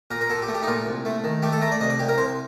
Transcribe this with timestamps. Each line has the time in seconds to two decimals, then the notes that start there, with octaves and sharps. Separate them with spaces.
0.11 A#2 A#4
0.21 A#4
0.30 A#2 A4
0.42 G4
0.48 A3
0.54 G4
0.63 D#4
0.67 A#2 F4
0.86 C2
1.05 A3
1.24 D#3
1.42 A3 G4
1.52 A4
1.61 A3 A#4
1.72 D5
1.81 C2 D#5
1.90 D5
1.99 C2 G4
2.09 A#4
2.18 C2 C5